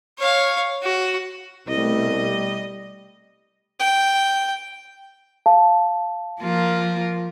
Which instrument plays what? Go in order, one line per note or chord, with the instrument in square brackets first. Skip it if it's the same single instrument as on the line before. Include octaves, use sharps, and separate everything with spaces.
[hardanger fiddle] C#5 F5
F#4
[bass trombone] C2 [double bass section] B2 A3 [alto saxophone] G3 [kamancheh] D#5
[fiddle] G5
[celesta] F5 A5
[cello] F3 [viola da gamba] A#3 F4 A#4